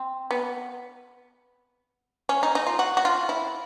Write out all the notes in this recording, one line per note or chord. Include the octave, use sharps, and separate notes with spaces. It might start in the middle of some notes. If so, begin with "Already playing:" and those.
Already playing: C4
B3
C#4
D#4
D#4
F4
F#4
F#4
F4
E4